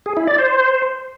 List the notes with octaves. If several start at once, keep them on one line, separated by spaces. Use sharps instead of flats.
G#4
E4
D5
C5